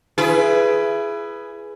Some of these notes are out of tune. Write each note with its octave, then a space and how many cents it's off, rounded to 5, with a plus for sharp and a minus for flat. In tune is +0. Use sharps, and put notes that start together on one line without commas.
E4 +35 G#4 +10 B4 +5